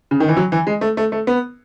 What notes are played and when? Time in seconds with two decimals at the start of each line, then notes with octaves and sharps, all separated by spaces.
0.11 C#3
0.20 D#3
0.28 E3
0.37 F#3
0.52 E3
0.67 G#3
0.81 A3
0.97 A3
1.12 A3
1.27 B3